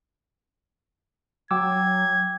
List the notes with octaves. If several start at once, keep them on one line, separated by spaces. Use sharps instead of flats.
F#3 G5 D6 E6 G#6